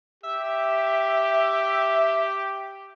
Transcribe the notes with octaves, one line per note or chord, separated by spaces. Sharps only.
G4 E5